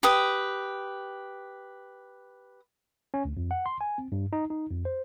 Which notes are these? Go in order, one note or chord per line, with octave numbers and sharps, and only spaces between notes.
G4 B4 D#6
C#4
D2
F2
F#5
C6
G#5
C4
G2
D#4
D#4
F2
C5